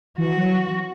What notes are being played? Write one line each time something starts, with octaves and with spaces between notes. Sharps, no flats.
E3 F#4
F#3